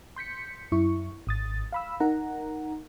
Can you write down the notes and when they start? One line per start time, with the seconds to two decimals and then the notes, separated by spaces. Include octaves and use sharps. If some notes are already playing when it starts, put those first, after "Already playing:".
0.16 C6 G6 B6 C#7
0.72 F#2 E4 C#6
1.27 G#1 D#6 A6
1.73 F5 B5 E6
2.00 D#4 A#4 F#5 A#5